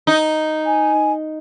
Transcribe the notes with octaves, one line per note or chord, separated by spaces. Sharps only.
D#4
G#5